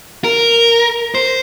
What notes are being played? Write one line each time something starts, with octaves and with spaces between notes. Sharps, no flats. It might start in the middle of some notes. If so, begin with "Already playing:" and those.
A#4
C5